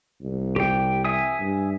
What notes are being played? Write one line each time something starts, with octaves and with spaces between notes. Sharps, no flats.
C2
G4 G5
E5 G#5 D#6
G2